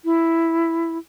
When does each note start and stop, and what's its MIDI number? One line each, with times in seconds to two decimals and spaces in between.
0.05 0.98 64